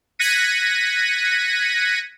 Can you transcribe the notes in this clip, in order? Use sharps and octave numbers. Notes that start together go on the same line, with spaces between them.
F#6 G#6 A#6 B6 C#7 D#7